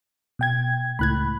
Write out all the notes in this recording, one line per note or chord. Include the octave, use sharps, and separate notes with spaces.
B2 G5 G#6
C#2 A2 B5 F#6 G#6